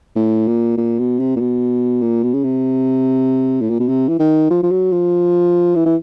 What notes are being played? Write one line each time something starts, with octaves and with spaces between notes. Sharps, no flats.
A2
A#2
A#2
B2
C3
A#2
B2
A#2
B2
C#3
C3
A2
A#2
B2
C3
E3
D#3
F3
F3
F#3
F3
E3
E3